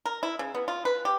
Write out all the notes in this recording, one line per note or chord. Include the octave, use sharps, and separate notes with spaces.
A#4
E4
C#3
B3
F4
B4
G4